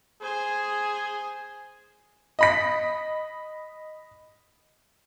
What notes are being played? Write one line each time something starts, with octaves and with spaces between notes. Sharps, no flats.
G#4 C5 G#5
D#5 B5 B6